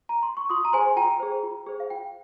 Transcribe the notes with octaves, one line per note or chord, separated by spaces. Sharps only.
A#5
C6
C#6
F4 C6 D#6
A#5
G#4 C5 G#5 C6
F4 G5 A#5
G#4 C5
F4
G#4 C5
F5
F4 G5